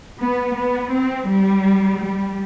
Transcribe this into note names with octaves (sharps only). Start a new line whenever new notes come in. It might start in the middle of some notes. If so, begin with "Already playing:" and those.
B3
B3
C4
G3
G3